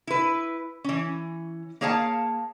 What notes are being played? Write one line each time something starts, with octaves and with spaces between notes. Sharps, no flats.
E4 B4
E3 C#4
A#3 G#4 C#5 F5 F#5 A5